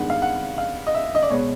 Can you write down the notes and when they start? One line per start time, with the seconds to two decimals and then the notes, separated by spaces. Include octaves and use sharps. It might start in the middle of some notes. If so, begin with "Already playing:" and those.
Already playing: G2 D#3 G#3 B3 F#5
0.10 F5
0.22 F#5
0.58 F5
0.87 D#5
0.95 E5
1.15 D#5
1.22 D5
1.30 B2 G#3 B3 C#5